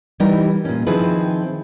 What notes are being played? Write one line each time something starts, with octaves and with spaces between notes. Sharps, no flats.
E3 G3 D#4 G4 A#4
A#2 C#4
D#3 F3 C4 E4 G#4 B4